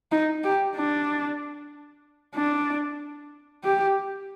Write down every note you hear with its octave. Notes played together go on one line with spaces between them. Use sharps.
D#4
G4
D4
D4
G4